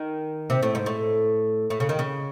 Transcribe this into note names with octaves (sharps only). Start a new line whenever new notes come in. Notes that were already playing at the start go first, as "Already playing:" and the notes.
Already playing: D#3
C3
A2
G#2
A2
A2
C#3
D#3
C#3